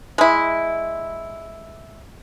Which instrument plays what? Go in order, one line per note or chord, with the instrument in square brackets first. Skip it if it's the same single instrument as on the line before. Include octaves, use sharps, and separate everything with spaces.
[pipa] G#3 E4